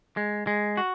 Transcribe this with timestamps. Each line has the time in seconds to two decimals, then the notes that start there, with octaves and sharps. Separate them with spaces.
0.17 G#3
0.47 G#3
0.77 F#4